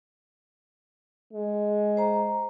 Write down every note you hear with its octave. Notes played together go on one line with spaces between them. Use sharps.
G#3
C5 A#5